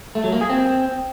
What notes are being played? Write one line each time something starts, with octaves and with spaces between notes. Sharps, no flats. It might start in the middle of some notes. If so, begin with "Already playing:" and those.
A3
F#3
A#3
G#4
C4